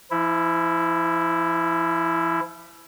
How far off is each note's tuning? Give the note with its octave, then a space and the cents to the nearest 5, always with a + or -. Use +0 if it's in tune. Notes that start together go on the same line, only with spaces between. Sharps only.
F3 -40 E4 +0